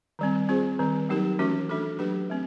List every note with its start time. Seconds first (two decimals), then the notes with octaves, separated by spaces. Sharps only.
0.19 D#3 G3 C4
0.49 C4 F4 G#4 C5
0.79 D#3 G3 C4
1.09 F#3 A#3 D#4 G4 A#4
1.39 E3 A3 C#4 F#4 A#4
1.69 A3 D4 F#4 A4
1.99 F#3 A#3 D4 G4 B4
2.30 A3 C4